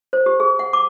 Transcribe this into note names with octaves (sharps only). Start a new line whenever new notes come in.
C5
G4
G#4
F#5
D6